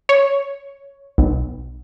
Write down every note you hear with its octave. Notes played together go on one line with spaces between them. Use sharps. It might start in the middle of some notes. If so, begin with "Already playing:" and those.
C#5
B1